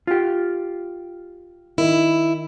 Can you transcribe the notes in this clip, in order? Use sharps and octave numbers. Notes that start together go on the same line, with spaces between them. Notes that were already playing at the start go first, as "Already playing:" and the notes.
F4 G4
D#3 E4